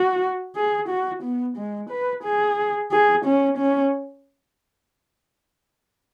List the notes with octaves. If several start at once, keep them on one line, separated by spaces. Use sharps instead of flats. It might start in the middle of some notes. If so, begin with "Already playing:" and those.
Already playing: F#4
G#4
F#4
B3
G#3
B4
G#4
G#4
C#4
C#4